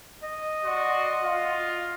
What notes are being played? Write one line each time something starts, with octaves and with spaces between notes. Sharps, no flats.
D#5
F#4 D5 C6
F4